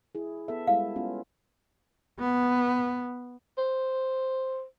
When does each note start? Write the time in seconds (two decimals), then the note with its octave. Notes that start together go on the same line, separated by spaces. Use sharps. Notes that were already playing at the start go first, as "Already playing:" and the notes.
0.15 E4 G#4
0.48 B3 A4 E5
0.67 G3 G#3 E4 F5
0.96 B3 C#4 F4
2.19 B3
3.58 C5